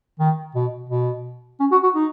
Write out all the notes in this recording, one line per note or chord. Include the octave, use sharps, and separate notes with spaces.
D#3
B2
B2
C#4
F#4
F#4
D#4